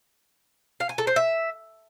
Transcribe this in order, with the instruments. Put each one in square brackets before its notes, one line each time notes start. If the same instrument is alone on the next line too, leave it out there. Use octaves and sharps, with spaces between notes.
[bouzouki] F5
G#5
A4
C5
E5